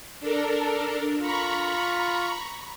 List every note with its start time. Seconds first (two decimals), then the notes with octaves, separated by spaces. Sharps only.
0.20 D4 A4 A#4
1.20 F4 A#5 B5 C#6